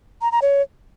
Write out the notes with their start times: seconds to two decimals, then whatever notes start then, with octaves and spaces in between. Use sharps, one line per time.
0.22 A#5
0.32 A#5
0.42 C#5